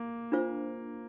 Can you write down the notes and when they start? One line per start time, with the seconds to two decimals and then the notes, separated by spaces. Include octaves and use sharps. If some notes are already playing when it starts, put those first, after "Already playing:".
Already playing: A#3
0.32 D4 F4 C5 F5